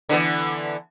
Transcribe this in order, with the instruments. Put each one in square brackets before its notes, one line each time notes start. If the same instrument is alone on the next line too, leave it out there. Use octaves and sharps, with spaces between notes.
[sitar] D3 E3 B3